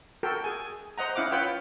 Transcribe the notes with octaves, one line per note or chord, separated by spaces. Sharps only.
F#4 A4 A#4 G5
G#4 G#5
C5 D#5 F#5 A#5
C#4 E4 F5 F#5 D6
F4 B4 C#5 F#5 G5